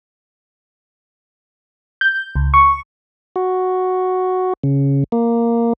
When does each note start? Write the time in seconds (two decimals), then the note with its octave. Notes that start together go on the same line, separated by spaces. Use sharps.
2.01 G6
2.36 C#2
2.54 C#6
3.36 F#4
4.63 C#3
5.12 A#3